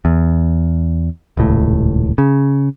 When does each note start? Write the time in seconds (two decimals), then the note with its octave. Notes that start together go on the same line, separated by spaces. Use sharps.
0.05 E2
1.37 D#1 C#2 A2
2.18 C#3